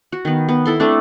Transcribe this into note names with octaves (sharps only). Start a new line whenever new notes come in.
F#4
D#3 B3
B3
E4 A4 C6
A3 C4 D4